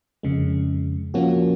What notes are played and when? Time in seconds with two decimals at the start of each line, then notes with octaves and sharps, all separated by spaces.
0.23 F2 C#3 G#3
1.14 A#2 F3 A#3 C#4 F#4